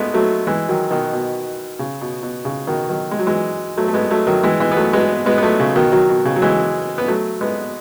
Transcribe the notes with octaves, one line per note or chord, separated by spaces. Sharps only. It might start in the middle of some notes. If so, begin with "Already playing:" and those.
Already playing: G#3 A3 B3
F#3 A3
E3 G#3
D#3 F#3
B2 D#3
B2
C#3
B2
B2
C#3
B2 D#3
D#3 F#3
G#3
F#3
E3 G#3
F#3 A3
A3
G#3 B3
F#3 A3
D#3 F#3
E3 G#3
E3 G#3
B3
F#3 A3
G#3 B3
G#3 B3
B3
F#3 A3
C#3
B2 D#3
D#3 F#3
B2
C#3
F#3
E3 G#3
B3
F#3 A3
G#3 B3